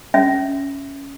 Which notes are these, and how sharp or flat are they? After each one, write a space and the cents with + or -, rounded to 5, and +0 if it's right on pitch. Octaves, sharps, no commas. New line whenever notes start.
C#4 +0 E5 +0